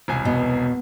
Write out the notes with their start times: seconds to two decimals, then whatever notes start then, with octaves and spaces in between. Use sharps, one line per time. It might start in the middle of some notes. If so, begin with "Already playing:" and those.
0.08 E1 C2 G#5
0.25 B2